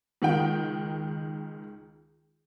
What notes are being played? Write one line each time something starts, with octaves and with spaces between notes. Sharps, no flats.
C#2 D#3 D#4 G5